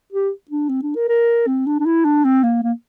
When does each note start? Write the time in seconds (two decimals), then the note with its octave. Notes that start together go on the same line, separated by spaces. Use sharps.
0.12 G4
0.51 D4
0.69 C4
0.83 D4
0.95 A#4
1.08 A#4
1.47 C4
1.66 D4
1.80 D4
1.85 E4
2.04 D4
2.24 C4
2.43 A#3
2.63 A#3